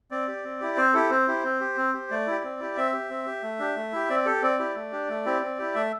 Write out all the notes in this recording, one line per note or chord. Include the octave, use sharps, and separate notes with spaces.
C4 D5
G4
C4
E4 G4
C4 C5
E4 G4 A4
C4 C5
E4 G4
C4
G4
C4
G4
A3 D5
E4 G4
C4
E4 G4
C4 E5
G4
C4
G4
A3
D4 G4
A3
E4 G4
C4 D5
G4 A4
C4 D5
E4 G4
A3
D4 G4
A3
C4 E4 G4
C4
E4 G4
A3 E5